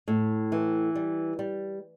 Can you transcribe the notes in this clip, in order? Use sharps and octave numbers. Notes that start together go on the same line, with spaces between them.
A2
E3
G3
G3